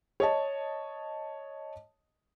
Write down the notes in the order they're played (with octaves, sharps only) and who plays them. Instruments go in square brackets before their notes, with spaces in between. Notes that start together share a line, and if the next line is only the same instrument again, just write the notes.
[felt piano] C#5 D#5 A5